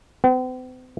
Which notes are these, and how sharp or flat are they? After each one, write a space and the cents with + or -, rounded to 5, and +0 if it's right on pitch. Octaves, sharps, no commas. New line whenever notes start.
C4 -45